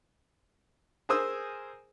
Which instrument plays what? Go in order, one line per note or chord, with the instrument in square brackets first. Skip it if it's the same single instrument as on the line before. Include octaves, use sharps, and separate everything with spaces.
[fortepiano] G#4 A#4 C5 G#5 D#6 E6